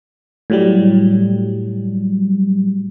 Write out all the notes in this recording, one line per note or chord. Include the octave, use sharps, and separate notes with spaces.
A2 F#3 G3